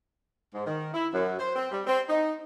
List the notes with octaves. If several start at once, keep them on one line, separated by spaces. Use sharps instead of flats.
G#2
D#3
E4
F#2
C5
C4
G3
C4
D#4